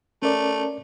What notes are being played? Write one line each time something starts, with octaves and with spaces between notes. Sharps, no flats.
A3 C#4 A#4 D5